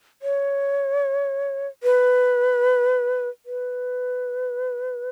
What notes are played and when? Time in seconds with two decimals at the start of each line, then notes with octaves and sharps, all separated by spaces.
0.22 C#5
1.83 B4
3.46 B4